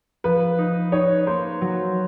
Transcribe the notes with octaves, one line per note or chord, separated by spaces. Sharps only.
F3 B4
D#4
D#4 C#5
A#3 C5
F#3